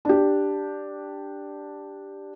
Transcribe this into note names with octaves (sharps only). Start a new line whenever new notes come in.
D4 G4